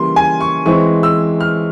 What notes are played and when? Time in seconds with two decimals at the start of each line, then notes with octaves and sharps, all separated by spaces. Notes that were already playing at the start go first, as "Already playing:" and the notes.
Already playing: C#3 E3 G3 A#3 C6
0.16 G#5
0.41 C#6
0.66 E3 G#3 C4 C#6
1.03 E6
1.40 F6